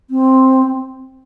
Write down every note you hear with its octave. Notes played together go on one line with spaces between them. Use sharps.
C4